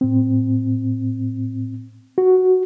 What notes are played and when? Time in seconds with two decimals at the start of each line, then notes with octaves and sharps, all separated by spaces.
0.01 A2 C4
2.18 F#4